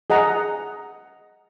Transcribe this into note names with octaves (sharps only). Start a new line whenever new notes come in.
G#4 D#5 F#5 A#5